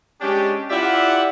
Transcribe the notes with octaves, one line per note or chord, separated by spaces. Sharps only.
G#3 C#4 D4 G4
E4 F4 G4 D5 E5 F#5